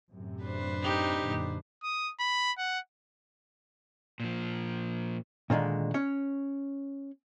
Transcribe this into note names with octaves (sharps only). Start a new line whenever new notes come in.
F#2 A2 C3
D4 B4 C5
D#4 G4
F#2 A#2 D3
D#6
B5
F#5
A#2 F3
A#2 D3 D#3 G#3
C#4 C#5